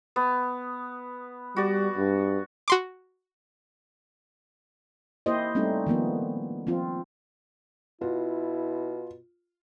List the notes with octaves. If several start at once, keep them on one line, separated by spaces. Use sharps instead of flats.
B3
G3 F#4 D5
G2
F#4 C6 D6
A#3 E4 G4 C5 D#5
G3 A3 C4 C#4 D#4
D#3 F3 A#3 B3
F3 C4 F4
B2 E4 F4